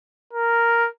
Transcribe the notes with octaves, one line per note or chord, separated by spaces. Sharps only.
A#4